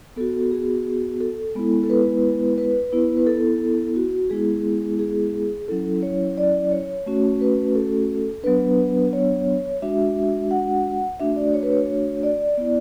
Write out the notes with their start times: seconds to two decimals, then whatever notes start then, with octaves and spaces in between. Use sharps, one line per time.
0.16 B3 F#4 A4
0.51 G#4
1.20 A4
1.55 G#3 B3 E4
1.84 A4
1.90 B4
2.58 B4
2.93 B3 E4
3.17 B4
3.27 A4
3.96 F#4
4.30 G#3 B3 E4 G#4
4.99 G#4
5.68 F#3 C#4 E4 A4
6.03 C#5
6.38 D5
6.71 C#5
7.06 A3 C#4 F#4
7.41 B4
7.75 A4
8.43 F#3 B3 D4 B4
9.13 C#5
9.82 G#3 D4 F#4 E5
10.51 F#5
11.20 A3 D4 F#4 E5
11.36 D5
11.53 C#5
11.63 B4
11.72 C#5
12.23 D5
12.58 B3 E4